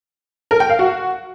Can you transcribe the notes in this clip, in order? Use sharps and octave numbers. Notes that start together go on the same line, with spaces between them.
A#4
G5
F5
F#4